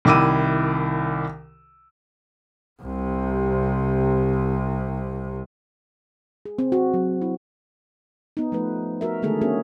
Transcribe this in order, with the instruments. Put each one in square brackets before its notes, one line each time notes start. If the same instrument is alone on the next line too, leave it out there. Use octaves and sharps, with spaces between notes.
[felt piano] C2 D#3 E4 D6 E6 D#7
[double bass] C2 C3
[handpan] G#4
C4
F#4
F#3
E4
B3 D#4
F3 A3 B4
F#4 A#4 E5
D3 D#3 G#3 A3 G#4 A4
A#3 B3 C#4 F#4 G#4